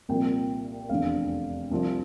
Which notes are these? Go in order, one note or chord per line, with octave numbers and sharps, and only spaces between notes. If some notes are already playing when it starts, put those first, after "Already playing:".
C2 A#2 F3 G5
F1 E2 D3 F5
C2 C3 F3